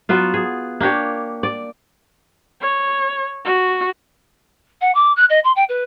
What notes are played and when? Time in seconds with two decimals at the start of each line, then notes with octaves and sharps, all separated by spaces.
0.09 F#3 B3 F4
0.34 G#4
0.81 A#3 D4 G4 C#5
1.43 D5
2.61 C#5
3.45 F#4
4.81 F#5
4.94 D6
5.16 F#6
5.29 D#5
5.44 C6
5.56 G5
5.69 B4